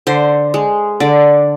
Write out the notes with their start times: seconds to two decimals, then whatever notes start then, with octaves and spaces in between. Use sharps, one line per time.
0.07 D3 C5
0.54 G#3
1.00 D3 D5